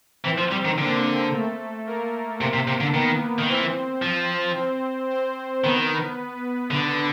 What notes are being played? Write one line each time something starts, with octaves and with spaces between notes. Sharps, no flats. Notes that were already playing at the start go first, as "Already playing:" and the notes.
E3 C4 C5
F3
G3
D#3
D3 A#3 A#4
A3 A4
A#3 A#4
C3
C3
C3
D3
D#3 B3 B4
D#3
E3 C4 C5
F3
C4 C5
C4 C5
D#3 B3 B4
D3 B3 B4